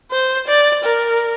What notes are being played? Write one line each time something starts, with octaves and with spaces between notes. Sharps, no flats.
C5
D5
A#4